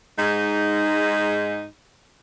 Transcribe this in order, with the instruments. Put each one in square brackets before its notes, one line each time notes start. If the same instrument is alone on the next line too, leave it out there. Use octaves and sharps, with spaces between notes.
[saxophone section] G#2 D#4